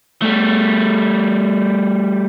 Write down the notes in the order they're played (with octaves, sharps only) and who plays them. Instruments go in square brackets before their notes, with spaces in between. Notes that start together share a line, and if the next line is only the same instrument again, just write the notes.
[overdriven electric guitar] G3 A3